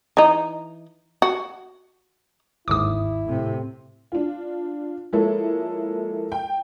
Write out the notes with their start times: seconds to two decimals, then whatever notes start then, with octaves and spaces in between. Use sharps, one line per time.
0.17 E3 D#4
1.22 F#4
2.68 G1 D#2 G#2 E4 D6 D#6
3.24 A2 C3
4.12 D4 F4
5.13 F3 G#3 A#3 E4 A4 C#5
6.32 G5